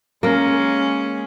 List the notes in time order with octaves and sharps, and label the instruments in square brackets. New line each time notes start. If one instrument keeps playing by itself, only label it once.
[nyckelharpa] G#3 C#4 [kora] A#3 A#4